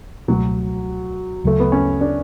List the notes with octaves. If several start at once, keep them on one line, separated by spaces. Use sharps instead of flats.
C#2 B2 F#3 A3
D2 C#3 F#3 A3
B3
C#4
D4